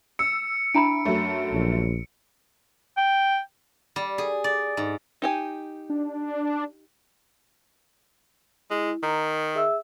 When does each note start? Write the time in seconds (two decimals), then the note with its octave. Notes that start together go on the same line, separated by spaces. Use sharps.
0.19 E6 C#7
0.74 D4 E4 A#5 B5 D7
1.05 F#2 A3
1.53 A#1
2.97 G5
3.96 G3
4.18 G#4
4.44 D5
4.77 G#2
5.22 D#4 G4 G#5
5.90 D4
8.71 G#3 E4
9.03 D#3 A#5
9.55 G#4 E5 E6